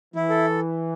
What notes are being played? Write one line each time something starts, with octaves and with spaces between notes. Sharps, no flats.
E3 E4
A4